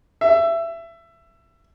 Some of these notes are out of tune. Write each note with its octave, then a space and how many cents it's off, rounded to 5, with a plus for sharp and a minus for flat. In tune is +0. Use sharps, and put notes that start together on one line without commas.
E5 +20